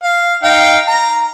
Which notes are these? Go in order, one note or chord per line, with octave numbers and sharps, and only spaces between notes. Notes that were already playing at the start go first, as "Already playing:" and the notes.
F5
D#4 F5 G5
A#5